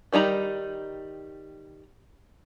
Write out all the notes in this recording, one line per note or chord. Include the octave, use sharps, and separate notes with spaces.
D#3 G3 D#4 A#5 B5